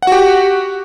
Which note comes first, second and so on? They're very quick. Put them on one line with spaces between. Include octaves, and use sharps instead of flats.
F#5 F#4 G4